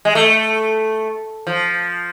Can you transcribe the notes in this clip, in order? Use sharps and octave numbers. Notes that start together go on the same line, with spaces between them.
G#3
A3
F3